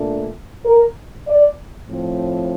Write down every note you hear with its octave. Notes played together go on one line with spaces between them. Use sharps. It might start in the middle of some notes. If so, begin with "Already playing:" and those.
Already playing: A#2 A3 D4
A#4
D5
A2 F3 C4